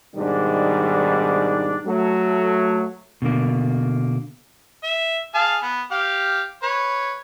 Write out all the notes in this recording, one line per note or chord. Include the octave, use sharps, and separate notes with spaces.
G#2 B2 D#3 G3 D4
F#3 A3
B2 D3 A#3
E5
G#4 F5 A5
B3
G4 F5
B4 C#5